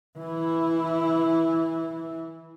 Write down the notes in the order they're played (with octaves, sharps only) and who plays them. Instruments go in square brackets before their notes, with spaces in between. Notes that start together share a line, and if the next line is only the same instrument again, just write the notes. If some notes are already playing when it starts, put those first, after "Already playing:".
[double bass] E3 E4